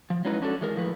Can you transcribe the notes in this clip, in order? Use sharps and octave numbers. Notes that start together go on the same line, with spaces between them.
F3
F#3 G#3 C#4 D#4 E4 B4
C#4 D4 F#4 A4
E3 G#3 A#4
A2 F3 B4